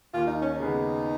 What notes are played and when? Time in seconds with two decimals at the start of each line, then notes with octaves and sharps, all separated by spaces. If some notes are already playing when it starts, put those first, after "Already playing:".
0.14 D#2 F4
0.27 D#4
0.41 C#4
0.54 D#4
0.60 C#3 G#3 B3